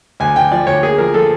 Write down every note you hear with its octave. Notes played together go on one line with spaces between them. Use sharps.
D2 G#5
D2 G5
F3 D5
D2 C#5
A#3 G#4
F3 A#4
F3 A4